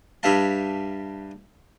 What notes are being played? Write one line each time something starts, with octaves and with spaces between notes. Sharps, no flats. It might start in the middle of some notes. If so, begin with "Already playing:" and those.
G2 G3 E5 F5 A5